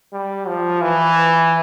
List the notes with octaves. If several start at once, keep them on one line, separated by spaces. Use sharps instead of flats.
G3
F3
E3